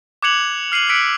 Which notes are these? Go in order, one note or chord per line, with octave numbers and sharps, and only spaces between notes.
D6 F#6 G#6 C#7 F7 F#7
F6 C7 D#7 F#7
E6 F#6 B6 C#7 D7